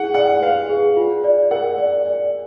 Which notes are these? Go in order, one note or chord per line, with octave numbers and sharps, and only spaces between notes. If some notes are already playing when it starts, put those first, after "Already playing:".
Already playing: E4 G#4 F#5
D5 F#5
B4 F5
G#4
F4
D5
A#4 F#5
D5
D5